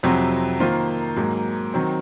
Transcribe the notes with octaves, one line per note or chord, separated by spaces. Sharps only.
F2 C3 F#3 C4 F#4
D#3 A#3 F4 C5
G#2 F#3 A#3
D#3 F#3 C4